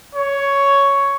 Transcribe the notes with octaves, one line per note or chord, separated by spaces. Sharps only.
C#5